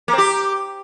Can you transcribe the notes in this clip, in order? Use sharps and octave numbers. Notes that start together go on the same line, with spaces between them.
A#3
C4
G4